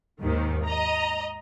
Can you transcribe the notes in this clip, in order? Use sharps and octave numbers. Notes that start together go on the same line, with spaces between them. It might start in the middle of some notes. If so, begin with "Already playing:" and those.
D#2 G#2 D#3
D#5 A#5